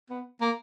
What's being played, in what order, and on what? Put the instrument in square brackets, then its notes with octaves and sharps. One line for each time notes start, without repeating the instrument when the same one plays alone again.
[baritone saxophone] B3
A#3